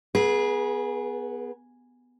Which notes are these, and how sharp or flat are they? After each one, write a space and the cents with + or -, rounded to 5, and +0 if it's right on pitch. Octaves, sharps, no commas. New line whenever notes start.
B3 +0 G#4 +0 B4 -40